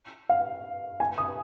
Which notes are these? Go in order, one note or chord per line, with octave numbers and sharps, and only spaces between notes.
F5
G#5
D#6